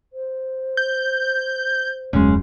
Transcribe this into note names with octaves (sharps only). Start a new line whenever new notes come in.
C5
G6
D#1 F#2 C#3 G#3